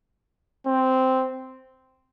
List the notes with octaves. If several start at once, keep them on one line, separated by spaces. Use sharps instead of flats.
C4